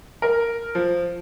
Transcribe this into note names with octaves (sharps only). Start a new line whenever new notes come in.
A#4
F3